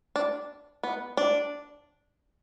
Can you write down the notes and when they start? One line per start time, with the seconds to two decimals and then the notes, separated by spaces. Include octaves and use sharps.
0.16 D4
0.83 B3
1.17 D4